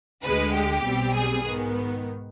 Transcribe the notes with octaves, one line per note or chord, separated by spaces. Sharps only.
D2 D3 G#3 B4
G4
B1 B2 G3 C4
G#4
G#2 D#3 B3